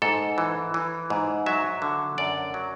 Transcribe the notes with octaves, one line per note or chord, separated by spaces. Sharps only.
G#2 A4
E3
E3
G#2
F#3 E5
D3
F#2 D5
F#3